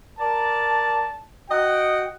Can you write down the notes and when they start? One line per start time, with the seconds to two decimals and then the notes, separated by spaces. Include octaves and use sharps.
0.19 A#4 D5 A5
1.50 F#4 D#5 F#5 G5